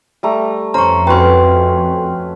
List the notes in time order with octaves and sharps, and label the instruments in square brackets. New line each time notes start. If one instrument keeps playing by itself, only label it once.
[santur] G3 A3 A#5
[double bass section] F2 [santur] C#4 C5 [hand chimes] A#5 C#6
[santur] C#4 F#4 B4 [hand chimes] G5 C6